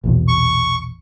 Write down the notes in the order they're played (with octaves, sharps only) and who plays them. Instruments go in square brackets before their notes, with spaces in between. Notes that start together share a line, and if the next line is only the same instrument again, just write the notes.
[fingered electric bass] A#1 E2 B2
[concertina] C#6